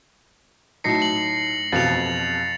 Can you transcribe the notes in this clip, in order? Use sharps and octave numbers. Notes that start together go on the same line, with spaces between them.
A2 F#3 D#4 A#6 C7 C#7
F#7
A1 F2 B2 A6 C#7 F7